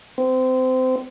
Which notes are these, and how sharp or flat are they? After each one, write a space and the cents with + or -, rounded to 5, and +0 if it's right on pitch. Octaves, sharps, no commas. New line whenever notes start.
C4 -25